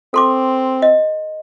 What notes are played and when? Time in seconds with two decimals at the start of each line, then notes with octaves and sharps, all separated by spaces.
0.14 C4 A4 C6 D6
0.82 D#5